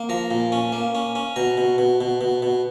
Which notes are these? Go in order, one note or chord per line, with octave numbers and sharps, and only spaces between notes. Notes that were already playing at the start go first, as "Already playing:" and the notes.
Already playing: A#3
F3 A#5
A#2
C#4
A#3
C#4
C#4
B2 A#5
B2
B2
B2
B2
B2